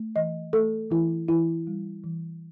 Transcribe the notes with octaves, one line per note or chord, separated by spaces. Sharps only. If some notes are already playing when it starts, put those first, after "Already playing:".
Already playing: A3
E3 D#5
A3 A4
E3 E4
E3 E4
G3
E3